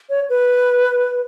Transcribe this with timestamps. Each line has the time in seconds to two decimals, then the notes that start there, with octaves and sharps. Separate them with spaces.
0.10 C#5
0.30 B4